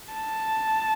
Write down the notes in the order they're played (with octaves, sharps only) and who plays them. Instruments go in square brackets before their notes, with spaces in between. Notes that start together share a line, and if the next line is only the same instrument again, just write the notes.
[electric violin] A5